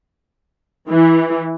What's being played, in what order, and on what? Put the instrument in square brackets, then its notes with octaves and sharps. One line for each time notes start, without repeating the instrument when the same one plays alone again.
[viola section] E3